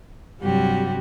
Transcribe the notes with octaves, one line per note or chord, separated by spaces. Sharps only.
G2 C3 F#3 G3 F#4 G4